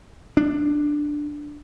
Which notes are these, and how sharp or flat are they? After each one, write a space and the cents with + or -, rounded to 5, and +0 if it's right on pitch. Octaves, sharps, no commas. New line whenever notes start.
D4 +5